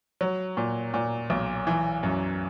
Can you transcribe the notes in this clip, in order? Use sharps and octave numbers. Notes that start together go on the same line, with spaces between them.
F#3
A#2
A#2
B1
E3
F#2